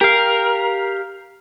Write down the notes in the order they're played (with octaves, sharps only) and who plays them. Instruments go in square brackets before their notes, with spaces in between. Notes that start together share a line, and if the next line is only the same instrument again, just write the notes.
[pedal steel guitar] G4 F5 [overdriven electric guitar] A#4